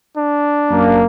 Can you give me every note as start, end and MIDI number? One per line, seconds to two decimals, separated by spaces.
0.17 1.02 62
0.71 1.04 42
0.71 1.04 58